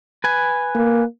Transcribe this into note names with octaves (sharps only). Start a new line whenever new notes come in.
B4 G#5
A#3